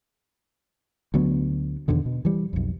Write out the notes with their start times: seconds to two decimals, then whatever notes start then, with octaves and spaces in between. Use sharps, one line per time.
1.14 D2 D3 F#3 B3
1.88 E2 B2 D3 D#3
2.05 B2
2.25 E3 G3
2.53 B1 F2